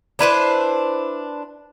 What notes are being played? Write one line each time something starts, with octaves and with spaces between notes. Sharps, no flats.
D4 E4 B4 C5